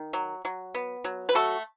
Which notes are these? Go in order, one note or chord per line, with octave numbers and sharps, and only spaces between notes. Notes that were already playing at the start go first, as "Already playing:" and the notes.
Already playing: D#3
F#3
F#3
B3
F#3
B4
A3 F#4 A4